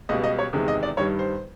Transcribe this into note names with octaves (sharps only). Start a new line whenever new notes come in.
C#2 B2 G3 D#5
D#5
C#5
E2 C3 D#3 G#3
D#5
D5
G2 D#3 G3 C#5
C5